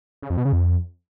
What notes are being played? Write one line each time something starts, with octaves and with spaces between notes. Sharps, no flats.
C#3
F2
B2
C#3
F2